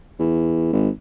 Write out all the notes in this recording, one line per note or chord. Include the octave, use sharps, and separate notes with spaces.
E2
G#1